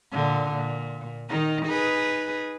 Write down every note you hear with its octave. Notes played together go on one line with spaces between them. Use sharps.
A#2 D3
A#2
D#3 D#4
D#4 G#4 B4